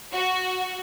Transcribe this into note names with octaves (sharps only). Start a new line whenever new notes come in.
F#4